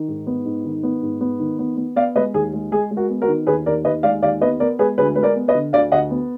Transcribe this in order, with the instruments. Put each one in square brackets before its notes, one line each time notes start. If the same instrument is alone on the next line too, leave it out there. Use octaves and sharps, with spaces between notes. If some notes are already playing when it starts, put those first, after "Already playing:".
Already playing: [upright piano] D#3
G#2
B3
G#2
D#3
B3
G#2
B3
D#3
B3
B3
B3 D5 F5
G#3 B4 D#5
D#2 G#4
G#3
G#3 G#4
G#3
F#4 A#4
B3
F#4 A#4
D#3
D#2 G#4 B4
D#2 A#4 D5
D#2 B4 D#5
G#3 D5 F5
D#2 D5 F5
B3 B4 D#5
B3 A#4 D5
G#3 G#4 B4
D2 G#4 B4
G#3 B4
A#4 D5
B3
B4 D#5
D3
D2 D5 F5
D2 D#5 F#5
B3